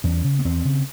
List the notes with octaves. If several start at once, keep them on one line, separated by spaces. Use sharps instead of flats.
E2 C#4
C#3
B3
E2 C4
C#3